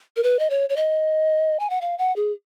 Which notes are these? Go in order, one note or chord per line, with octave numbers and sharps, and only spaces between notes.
A#4
B4
D#5
C#5
C#5
D#5
G#5
F#5
F5
F#5
G#4